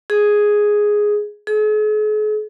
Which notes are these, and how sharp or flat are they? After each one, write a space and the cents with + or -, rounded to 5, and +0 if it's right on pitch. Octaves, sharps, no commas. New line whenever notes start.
G#4 +0
G#4 +45